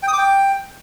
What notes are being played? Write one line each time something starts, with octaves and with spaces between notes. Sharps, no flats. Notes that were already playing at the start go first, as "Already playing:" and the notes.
G5
D#6
D6
G5